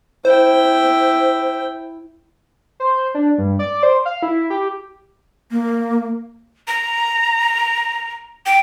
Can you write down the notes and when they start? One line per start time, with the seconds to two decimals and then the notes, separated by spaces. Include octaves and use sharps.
0.25 E4 C5 G5
2.80 C5
3.14 D4
3.38 G2
3.59 D5
3.83 C5
4.05 F5
4.22 E4
4.50 G4
5.51 A#3
6.68 A#5
8.46 G5